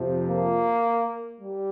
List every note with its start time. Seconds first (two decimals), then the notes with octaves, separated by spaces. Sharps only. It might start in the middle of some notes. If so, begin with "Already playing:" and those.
Already playing: F2 C3 F3
0.30 A#3
1.40 G3